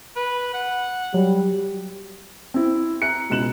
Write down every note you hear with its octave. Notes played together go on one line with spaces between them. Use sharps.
B4
F#5
F#3 G3
C4 E4
E5 A#5 F#6 C#7
C#2 B2 F#6 E7 F#7